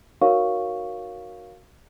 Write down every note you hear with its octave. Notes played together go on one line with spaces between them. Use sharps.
D#4 F#4 A#4 C#5 F5 C#6